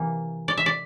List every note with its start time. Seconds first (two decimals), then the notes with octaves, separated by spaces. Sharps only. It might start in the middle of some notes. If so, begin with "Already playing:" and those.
Already playing: C3 E3 A#3
0.48 D5
0.57 E5
0.66 D5